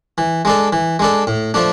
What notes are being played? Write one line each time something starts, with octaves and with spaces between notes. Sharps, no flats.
E3
G#3 D4 A4
E3
G#3 D4 A4
A2
F3 A3 D4